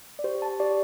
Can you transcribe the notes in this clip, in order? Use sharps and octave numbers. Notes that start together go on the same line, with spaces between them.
D5
G4 C5
A5
G4 D5